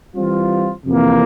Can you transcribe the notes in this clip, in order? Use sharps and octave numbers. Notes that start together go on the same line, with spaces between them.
E3 G3 C4 F4
F2 C3 E3 A#3